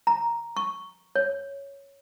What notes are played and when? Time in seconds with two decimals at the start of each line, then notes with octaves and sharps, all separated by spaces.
0.07 A#5
0.57 C#6
1.16 C#5